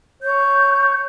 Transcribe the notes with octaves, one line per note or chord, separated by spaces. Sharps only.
C#5 G6